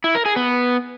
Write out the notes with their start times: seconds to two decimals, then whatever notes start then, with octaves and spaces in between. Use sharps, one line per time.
0.04 E4
0.15 A#4
0.26 G#4
0.36 B3